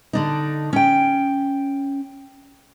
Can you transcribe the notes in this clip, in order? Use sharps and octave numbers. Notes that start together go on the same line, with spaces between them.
D3 D4 D#4
C#4 G5